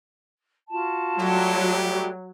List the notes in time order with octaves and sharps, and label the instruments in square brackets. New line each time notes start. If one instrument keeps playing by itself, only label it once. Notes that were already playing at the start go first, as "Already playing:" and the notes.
[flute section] F4 F#4 A5
[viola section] F#3 [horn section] G3 A3 G4